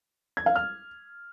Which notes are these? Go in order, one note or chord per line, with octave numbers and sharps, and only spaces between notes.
G#6
F5
F6